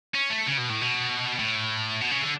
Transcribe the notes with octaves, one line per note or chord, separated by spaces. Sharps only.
C#4
A3
C#3
B2
A2
B2
A2
B2
C#3
D3